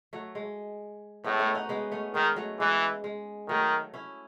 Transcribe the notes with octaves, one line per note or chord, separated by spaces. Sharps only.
F#3 A3
G#3
A2 G#3 B3
A3 C#4
D#4 F#4
G#3 B3
A3 C#4
D#3 G#3 B3
F#3 A3
E3 G#3
G#3
D#3 F#3 A3
C#4 E4